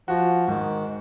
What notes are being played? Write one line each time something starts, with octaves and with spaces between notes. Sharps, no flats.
F3 F#4
G#2 D#3